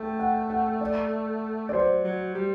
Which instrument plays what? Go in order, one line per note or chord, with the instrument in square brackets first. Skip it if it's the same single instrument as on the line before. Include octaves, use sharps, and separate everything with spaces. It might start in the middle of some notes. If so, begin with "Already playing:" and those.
Already playing: [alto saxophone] A3 [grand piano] G5
[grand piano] F#5
F#5
D5
D5
[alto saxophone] F#3 [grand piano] C5
[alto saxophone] F#3
G3